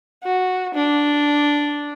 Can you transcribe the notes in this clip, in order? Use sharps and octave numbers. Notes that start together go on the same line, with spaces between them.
F#4
D4